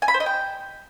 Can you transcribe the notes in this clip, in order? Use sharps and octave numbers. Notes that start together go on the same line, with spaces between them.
G#5
B5
C5
D#5
G5